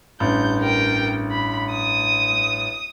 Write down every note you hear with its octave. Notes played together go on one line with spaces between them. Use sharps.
A1 G2 G6
A#4 G5
B5
D#6